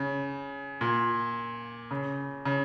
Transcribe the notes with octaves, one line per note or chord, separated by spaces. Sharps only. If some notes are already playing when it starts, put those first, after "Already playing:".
Already playing: C#3
A#2
C#3
C#3